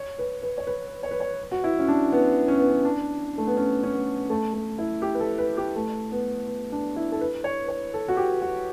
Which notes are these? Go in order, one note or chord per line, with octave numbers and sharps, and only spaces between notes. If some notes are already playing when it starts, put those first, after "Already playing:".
Already playing: C#5
B4
B4
C#5
B4
C#5
B4
C#5
F#4
E4
C#4
D4
B3
C#4
B3
C#4
D4
A3
B3
C#4
C#4
B3
A3
A3
E4
G4
B4
A4
B4
G4
A3
B3
B3
D4
E4
A4
B4
C#5
C#5
A4
F#4
G4
F#4